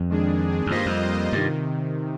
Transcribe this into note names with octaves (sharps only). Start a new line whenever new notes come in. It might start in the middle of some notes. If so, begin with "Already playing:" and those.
Already playing: F2
D#3 G#3 D4 G#4
F2
G2 G3 A#3 F4 C5 D#5
F2
G2 C3 D#3